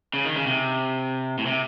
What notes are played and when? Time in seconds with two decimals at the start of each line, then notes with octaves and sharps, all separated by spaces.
0.14 C#3
0.25 D#3
0.36 C#3
0.47 C3
1.38 A2
1.46 C3